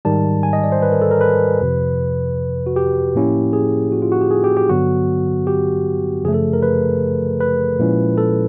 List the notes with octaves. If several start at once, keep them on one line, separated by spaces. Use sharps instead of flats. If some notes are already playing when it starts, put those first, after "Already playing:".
G#2 D#3 G3 A5
G#5
D#5
D5
C5
B4
A#4
A4
A#4
B4
F2 C3 F3
F#4
G4
A2 F3 A#3 C#4 E4
G#4
F#4
F4
F#4
G4
G#4
G4
G4
G2 D3 F#3 B3 F#4
G4
F#2 C#3 F3 A3 G#4
A4
A#4
B4
B4
A#2 F3 G#3 C#4 E4
A4